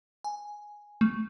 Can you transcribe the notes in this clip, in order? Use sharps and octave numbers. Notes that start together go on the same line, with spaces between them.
G#5
A3